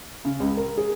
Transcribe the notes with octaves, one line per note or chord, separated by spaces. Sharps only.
C#3
C#2
A#4
G#4